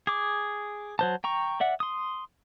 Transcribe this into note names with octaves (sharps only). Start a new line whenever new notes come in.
G#4 D6
F#3 C5 A5
G5 A#5 C#6
D5 E5 F#5
C6 D#6